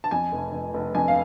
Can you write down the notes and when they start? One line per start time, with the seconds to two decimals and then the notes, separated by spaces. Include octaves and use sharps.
0.04 A5
0.11 F2 G#5
0.32 F1
0.53 F1
0.74 F1
0.95 F2 G#5
1.08 F5